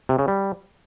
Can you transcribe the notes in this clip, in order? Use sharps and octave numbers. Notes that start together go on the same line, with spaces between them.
C3
C#3
G3